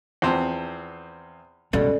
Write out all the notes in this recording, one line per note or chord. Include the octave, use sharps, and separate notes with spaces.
E2 F3 C4
C#2 G2 B2 C#4 A4 D5 D#5